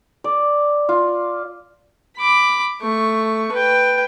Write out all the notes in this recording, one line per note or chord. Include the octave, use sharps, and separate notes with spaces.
D5
F4
B5 D6
A3 C#6
B4 G5